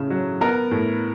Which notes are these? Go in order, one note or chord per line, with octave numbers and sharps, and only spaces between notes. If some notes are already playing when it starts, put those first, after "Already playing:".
Already playing: A2 C#3
F#3
B3 A#4
A2